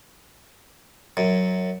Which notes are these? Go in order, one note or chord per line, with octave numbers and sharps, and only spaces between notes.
F#2